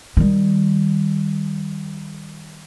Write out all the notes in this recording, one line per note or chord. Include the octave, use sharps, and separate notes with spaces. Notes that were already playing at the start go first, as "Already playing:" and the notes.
D#3 G3